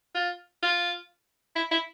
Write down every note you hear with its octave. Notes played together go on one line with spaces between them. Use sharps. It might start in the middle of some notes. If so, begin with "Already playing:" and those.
F4
F4
E4
E4